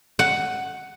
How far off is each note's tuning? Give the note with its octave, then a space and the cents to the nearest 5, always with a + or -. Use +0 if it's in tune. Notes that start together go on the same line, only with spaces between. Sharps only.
F#5 +5